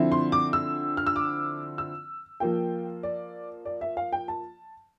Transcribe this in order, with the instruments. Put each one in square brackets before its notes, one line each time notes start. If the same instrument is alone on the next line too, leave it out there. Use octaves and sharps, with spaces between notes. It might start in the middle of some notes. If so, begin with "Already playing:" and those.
Already playing: [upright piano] D3 F3 C4 E4
C6
D6
E6
F6
E6
D6
E6
F3 A#3 F4 G5
D5
D5
E5
F5
G5
A5